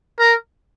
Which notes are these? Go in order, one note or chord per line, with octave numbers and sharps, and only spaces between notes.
A#4